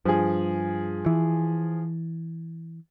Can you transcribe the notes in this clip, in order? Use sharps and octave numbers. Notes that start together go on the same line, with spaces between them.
G2 F3 G#4
E3